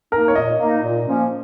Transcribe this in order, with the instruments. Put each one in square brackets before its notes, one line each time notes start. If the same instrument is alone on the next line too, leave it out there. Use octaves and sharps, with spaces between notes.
[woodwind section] A#3 D#4 [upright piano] A#4
[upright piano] C#5
[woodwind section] A#2 [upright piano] D#5
[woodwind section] A#3 D#4
A#2
F3 A#3 C#4